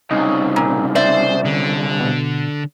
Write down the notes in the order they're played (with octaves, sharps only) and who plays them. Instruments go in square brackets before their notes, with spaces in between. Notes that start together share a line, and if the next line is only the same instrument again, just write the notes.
[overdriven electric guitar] C2 C#3 [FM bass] D#4
[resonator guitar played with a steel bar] A#2
[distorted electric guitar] C5 [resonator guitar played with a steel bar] D5 E5
[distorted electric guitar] D3
[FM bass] B2